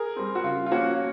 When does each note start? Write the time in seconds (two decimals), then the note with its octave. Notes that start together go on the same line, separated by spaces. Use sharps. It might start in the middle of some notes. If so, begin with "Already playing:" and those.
Already playing: G#4 A#4
0.16 G3 C4
0.35 F#4
0.44 C#3 F4
0.66 F4
0.71 F3 A#3 C#4 F#4